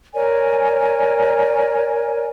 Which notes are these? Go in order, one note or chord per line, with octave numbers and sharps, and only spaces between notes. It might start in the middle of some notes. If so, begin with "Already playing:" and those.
A#4 C#5 D5 G#5